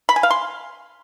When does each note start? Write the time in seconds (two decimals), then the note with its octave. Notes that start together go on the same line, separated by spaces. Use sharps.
0.09 B5
0.16 G#5
0.23 F5
0.31 C6